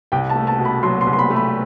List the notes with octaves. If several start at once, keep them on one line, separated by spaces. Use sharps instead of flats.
C2 G5
A5
A3
A5
B2
B5
F#3 C6
C6
C2
C6
B5
A3
B5